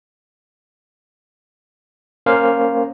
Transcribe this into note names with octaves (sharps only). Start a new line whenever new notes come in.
A#3 C#4 A#4 C5 F5